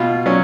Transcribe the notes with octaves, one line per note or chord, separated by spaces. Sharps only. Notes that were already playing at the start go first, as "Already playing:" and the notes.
Already playing: B2 F4
F#3 C#4